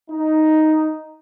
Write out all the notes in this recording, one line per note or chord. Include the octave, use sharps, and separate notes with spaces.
D#4